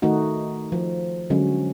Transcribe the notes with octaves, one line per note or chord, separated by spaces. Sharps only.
D#3 A3 D#4 F#4
F3
D3 F#3 G#3 C#4